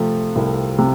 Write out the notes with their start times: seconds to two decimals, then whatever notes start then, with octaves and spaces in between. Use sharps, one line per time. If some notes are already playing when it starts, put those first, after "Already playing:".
Already playing: C3 F3 A3
0.36 C2
0.78 C3